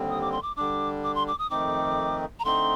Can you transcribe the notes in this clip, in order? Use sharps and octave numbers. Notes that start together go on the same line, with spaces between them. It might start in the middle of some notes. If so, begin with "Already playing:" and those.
Already playing: D#2 D3 G3 C4
D#6
D6
C6
D6
D3 G3 D4 D6
D6
C6
D6
D#6
F2 D#3 A3 C4 D#4 D6
A#5
D3 A3 C4 D#4 C6